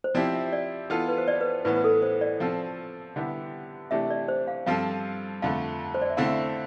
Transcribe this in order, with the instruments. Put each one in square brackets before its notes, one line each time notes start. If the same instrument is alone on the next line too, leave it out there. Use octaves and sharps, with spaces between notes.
[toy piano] C5
[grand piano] F3 C4 E4 G4 [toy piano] D5
[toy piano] E5
D5
[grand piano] E3 B3 F4 A4
[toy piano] B4
C5
D5
B4
C5
[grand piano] A2 E3 B3 [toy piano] B4
[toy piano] B4
A4
C5
D5
[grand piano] F3 C4 F4 A4 [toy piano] F5
[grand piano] D3 G3 B3 E4 G4
[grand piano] C3 E3 A3 D4 G4 [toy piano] E5
[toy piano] D5
C5
F5
[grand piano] G2 F3 C4 F4 A4 [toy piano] F5
[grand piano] F2 D3 A3 [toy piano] F5
[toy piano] C5
D5
E5
[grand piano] D3 A3 C4 E4 [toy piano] F5